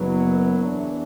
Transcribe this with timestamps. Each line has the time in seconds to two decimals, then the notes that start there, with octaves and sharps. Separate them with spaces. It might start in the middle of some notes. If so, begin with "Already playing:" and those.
Already playing: F#1 F#2 F#3 B3 E4
0.63 E2 E3 D4